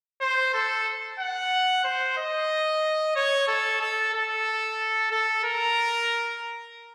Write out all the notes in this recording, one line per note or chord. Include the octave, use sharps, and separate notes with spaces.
C5
A4
F#5
C5
D#5
C#5
A4
A4
A4
A4
A#4